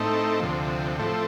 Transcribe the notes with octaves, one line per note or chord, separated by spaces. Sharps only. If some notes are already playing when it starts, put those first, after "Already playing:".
Already playing: A2 A3 C4 D#4
D2 C3 F3
A2 F3 A3 C4